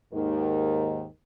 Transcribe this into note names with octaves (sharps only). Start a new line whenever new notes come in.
D#2 G#2 D#3